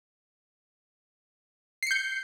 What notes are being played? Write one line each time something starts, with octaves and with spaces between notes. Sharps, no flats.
G6 C7 C#7